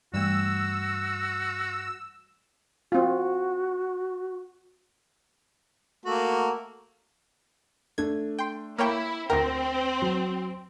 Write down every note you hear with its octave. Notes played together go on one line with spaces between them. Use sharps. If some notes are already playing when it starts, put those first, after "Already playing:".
G2 E3 G3 A3 F#4 E6
C4 F4 F#4
A3 A#3 F#4
A3 D4 G#6
G5 C6
A#3 E4 C#5 G5
D2 C4 A#4 G5 A#6
F#3